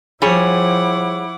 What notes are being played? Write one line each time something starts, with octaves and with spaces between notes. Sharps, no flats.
F3 G3 E4 G#4 C#5 F#5 D6